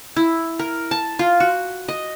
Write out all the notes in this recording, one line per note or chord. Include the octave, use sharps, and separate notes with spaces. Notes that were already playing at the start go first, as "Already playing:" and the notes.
E4
A#4
A5
F4
F#4
D#5